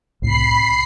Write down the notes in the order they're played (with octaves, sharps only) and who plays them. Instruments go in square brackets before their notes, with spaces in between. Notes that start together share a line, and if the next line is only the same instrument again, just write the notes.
[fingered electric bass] C2 A2 C3 [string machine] B5 C7